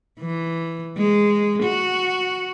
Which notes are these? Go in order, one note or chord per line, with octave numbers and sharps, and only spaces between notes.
E3
G#3
F#4